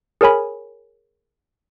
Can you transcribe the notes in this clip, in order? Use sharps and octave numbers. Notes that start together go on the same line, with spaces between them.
G#4 A#4 C#5 G#5 B5